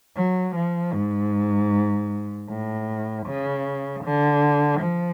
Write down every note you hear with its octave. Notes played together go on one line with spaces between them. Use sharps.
F#3
F3
G#2
A2
C#3
D3
F3